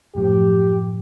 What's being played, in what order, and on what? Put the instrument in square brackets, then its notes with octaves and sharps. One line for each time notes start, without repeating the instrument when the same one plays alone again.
[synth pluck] F#2 A2 F3 [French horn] G4